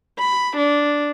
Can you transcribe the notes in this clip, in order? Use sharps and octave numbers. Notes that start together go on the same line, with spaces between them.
B5
D4